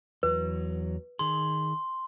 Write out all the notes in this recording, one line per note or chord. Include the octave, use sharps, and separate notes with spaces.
E2 F#3 B4
D#3 G#4 C6